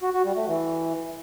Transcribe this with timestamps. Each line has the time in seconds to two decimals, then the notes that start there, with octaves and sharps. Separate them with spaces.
0.03 F#4
0.14 F#4
0.25 G3
0.36 A3
0.47 E3